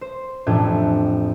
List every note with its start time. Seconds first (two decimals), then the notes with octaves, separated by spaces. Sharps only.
0.01 C5
0.47 A1 F2 A2 D4 G6 G#6